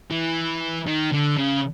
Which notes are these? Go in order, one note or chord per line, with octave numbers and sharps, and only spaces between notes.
E3
D#3
D3
C#3